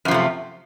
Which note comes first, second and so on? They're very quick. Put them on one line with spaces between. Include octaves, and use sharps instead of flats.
F#2 F3 C3 A3